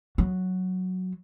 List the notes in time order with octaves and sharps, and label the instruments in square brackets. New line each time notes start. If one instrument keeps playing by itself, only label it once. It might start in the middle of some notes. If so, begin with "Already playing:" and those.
[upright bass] F#3